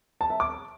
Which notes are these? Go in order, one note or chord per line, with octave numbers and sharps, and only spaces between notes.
A5
E5
D6